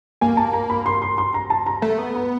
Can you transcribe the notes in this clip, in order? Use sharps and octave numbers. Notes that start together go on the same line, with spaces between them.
A#3 G#5
A5
A#5
B5
C6
C6
C6
A#5
A5
A#5
A3
B3
B5